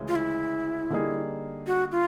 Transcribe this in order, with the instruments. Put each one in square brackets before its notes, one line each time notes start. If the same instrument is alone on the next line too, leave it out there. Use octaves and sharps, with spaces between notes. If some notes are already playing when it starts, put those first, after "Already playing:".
Already playing: [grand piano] D2 C#3 E3 G#3 C#4
[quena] F4
E4
[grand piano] D3 G3 A#3 D#4 G#4
[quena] F#4
F4